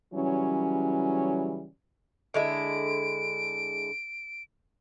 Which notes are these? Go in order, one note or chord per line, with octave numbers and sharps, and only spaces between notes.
C#3 E3 F#3 G3 C#4
D3 G#3 E4 D7